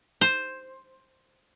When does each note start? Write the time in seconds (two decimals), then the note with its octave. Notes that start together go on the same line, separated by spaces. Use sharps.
0.21 C5